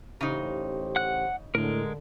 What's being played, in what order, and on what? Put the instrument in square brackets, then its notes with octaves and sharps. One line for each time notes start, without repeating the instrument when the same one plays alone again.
[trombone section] A1 G4 C5 [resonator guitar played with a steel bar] C#3 D#4
[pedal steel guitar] F#5 F#6
[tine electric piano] A2 [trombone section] D3 [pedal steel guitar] G#3 A#4